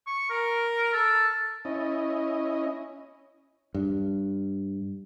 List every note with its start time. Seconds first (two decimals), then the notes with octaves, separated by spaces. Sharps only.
0.07 C#6
0.30 A#4
0.94 A4
1.65 C#4 E4 D#5
3.74 G2